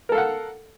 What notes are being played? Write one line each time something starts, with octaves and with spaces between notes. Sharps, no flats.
A4 A#4 F5 F#5